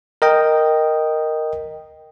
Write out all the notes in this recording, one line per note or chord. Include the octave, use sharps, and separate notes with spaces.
A#4 D#5 G5